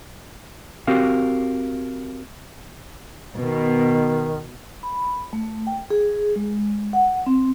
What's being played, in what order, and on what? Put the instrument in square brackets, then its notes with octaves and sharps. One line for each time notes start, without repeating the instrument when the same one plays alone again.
[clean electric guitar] C4 F#4 G4 A#4 F5
[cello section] B2 [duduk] D#3
[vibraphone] B5
A3
G5
G#4
G#3
F#5
C4